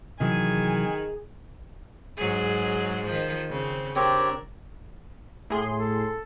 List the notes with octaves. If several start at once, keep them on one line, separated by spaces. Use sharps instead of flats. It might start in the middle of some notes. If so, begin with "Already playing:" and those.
C3 D#3 E3 F#3 G#4 G#5
G#2 F#3 G#4
D#3 F3
C#3 C4
C4 D4 G4 A#4 C#5
A2 G#4 C6
A4